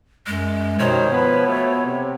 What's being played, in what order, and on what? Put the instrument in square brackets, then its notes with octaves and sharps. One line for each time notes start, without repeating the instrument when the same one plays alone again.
[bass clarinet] F#2 [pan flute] G#3
[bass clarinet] B2 [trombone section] D#3 G3 C5 [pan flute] C#5
[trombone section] F3 B4 [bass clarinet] B3
[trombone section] B2 F3 A3
C3